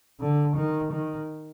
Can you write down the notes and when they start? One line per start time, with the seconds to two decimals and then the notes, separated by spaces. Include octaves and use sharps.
0.20 D3
0.56 D#3
0.92 D#3